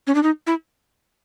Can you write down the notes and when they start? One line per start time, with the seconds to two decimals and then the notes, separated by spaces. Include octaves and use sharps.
0.07 C#4
0.15 D4
0.23 D#4
0.47 E4